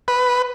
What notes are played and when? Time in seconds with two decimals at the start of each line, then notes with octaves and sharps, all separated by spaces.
0.08 B4